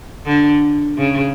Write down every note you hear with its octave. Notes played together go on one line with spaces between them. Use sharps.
D3
C#3